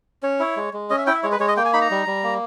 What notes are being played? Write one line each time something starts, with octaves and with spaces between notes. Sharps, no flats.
C#4 C#5
E4
G#3
G#3
C#4 D#5
E5
E4 G5
E5
G#3 C#5
B4
G#3 C#5
D#5
A#3 G5
G#5
D#4 B5
A#5
G3
G3
A#3